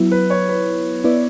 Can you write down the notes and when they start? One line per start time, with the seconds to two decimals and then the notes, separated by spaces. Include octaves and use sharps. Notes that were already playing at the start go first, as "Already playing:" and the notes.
Already playing: F#3 B3 E4
0.12 B4
0.30 C#5
0.49 B4
1.04 B3 E4 B4 D5